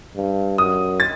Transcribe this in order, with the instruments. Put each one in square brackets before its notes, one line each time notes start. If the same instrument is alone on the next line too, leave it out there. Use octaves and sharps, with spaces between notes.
[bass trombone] G2
[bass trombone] F#2 [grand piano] D#6
[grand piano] A6